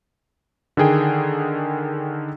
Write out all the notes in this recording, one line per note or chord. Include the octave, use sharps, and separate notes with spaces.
D3 D#3 G#4 G5